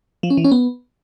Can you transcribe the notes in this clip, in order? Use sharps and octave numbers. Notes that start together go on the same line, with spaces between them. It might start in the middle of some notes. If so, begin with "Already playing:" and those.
F3
C#4
E3
C#4
B3